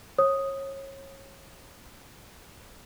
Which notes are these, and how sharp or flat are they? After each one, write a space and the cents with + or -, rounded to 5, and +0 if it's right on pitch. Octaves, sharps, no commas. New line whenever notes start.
C#5 -25 D#6 +0